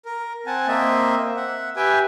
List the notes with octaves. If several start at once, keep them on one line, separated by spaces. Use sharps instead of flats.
A#4
C4 F#5 G#5 A5
A#3 C4 D#5 E5
E5 F#5
G4 B4 E5 G5 G#5